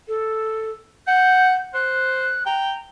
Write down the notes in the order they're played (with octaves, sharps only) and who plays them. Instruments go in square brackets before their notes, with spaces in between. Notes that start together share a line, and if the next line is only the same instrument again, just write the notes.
[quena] A4
[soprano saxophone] F#5 [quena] G6
[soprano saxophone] C5 [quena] F#6
[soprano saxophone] G5 [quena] A#5